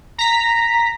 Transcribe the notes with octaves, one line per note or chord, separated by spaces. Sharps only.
A#5 B6